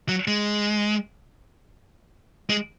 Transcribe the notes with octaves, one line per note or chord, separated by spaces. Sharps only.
F#3
G#3
G#3